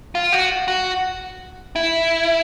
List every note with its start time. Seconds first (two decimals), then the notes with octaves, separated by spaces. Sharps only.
0.15 F4
0.32 F#4
0.68 F#4
1.76 E4